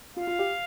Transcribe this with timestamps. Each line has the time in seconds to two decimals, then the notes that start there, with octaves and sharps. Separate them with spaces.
0.16 F4 F5
0.27 F4
0.39 G4